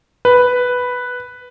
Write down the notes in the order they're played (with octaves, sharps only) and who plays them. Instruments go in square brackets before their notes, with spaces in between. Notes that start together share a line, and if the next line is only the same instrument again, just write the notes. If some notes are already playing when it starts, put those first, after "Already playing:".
[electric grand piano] B4